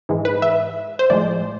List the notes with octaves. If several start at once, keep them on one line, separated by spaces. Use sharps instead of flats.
G#2 E3 G#3
B4
E5
C5
A2 F3 G#3 D5